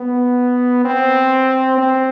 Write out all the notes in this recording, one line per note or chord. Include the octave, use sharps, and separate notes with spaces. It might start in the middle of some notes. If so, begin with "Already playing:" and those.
Already playing: B3
C4
C4